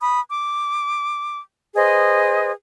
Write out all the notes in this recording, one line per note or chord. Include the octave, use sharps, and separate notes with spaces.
B5 D#6
D6
G#4 B4 C5 D#5